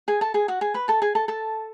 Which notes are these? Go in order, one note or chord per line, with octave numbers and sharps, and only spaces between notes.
G#4 G#5
A4 A5
G#4 G#5
F#4 F#5
G#4 G#5
B4 B5
A4 A5
G#4 G#5
A4 A5
A4 A5